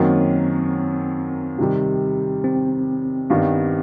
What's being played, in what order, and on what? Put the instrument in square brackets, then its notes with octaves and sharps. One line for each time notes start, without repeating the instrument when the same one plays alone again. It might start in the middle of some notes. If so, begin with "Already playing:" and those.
Already playing: [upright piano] F#2 D#3 F#3 A#3 [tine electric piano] C4
[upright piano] C3 D#3 G3
[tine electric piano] C4
[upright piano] G2 D#3 G3 B3